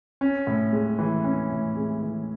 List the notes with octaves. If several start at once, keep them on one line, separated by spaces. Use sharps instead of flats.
C#4
A2
G#3
E3
C#4
A2
G#3
E3